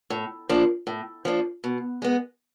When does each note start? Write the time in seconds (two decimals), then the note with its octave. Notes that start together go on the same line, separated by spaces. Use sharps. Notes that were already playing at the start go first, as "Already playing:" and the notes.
0.10 A2
0.49 F3 A#3 D4
0.87 A2
1.25 F3 A#3 D4
1.64 B2
2.02 G#3 B3